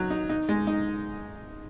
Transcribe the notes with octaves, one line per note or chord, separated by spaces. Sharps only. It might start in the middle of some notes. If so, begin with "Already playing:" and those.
Already playing: F#3 D#4
D#4
D#4
G#3
D#4